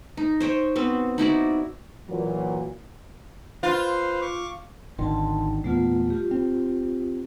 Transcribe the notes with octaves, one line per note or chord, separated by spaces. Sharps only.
D#4
C5 C#5 G5
B3 C4 F#4
D#4 E4 F#4 D5
A#2 E3 F#3
F4 B4 C5
C#6 D6
G#1 D3 D#3 A5 C6
E2 A#2 G3 A3 B3 F4
F4 G4
C4